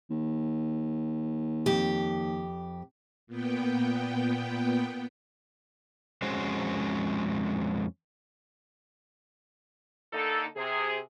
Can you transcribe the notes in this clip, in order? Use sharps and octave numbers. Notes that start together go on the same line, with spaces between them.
D#2
F2 G4
A#2 B3 G5
F2 G#3 C#4 F#4 C5
D3 A#3 D#4 A4
C3 G#4